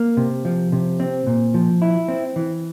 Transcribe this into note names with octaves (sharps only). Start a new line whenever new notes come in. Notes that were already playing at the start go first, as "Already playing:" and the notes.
Already playing: A#3
C3
F3
C3
C4
A#2
F3
E4
C4
E3